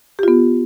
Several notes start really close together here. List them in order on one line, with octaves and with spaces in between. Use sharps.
G4 F4 B3